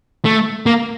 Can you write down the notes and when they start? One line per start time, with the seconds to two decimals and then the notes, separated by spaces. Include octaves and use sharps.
0.25 A3
0.66 A#3